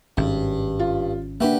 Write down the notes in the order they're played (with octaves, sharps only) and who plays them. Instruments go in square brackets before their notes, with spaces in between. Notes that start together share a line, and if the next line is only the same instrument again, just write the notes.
[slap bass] G#1 [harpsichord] G2 [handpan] C#4
[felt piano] F4
[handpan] A#3 D4 [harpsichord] F#4 G4 B4 [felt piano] E5